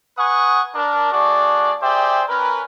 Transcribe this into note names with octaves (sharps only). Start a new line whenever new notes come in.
B4 F#5 G#5 C#6 D#6
D4 A#4
A3 D4 F#4 G#4 D5
G4 G#4 C5 D5 E5 G5
C#4 A#4 B4